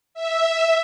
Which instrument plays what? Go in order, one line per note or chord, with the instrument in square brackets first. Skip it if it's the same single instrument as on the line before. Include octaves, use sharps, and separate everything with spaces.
[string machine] E5